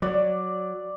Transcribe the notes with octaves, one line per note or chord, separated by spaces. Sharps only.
F#3 D5